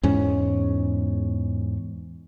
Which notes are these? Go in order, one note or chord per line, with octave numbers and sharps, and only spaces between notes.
E2 G#2 C#4